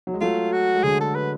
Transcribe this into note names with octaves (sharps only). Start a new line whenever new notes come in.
F#3
G#3
F#3 A3 F4
F#4
G#3
D3 F#3 G#4
A4
B4